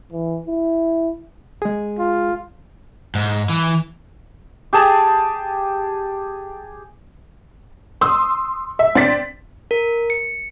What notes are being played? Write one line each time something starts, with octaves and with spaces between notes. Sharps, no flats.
E3
E4
G#3 G#4
F4
G#2
E3
G4 G#4 A5
C6 D#6 E6
E5
C4 D4 A6 B6
A#4
C#7